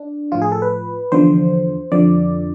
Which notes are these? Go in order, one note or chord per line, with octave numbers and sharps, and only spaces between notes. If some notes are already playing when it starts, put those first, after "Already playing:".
Already playing: D4
A2 F3 F4
G#4
A4
B4
E2 D3 F3 C5
F2 D3 F3 D5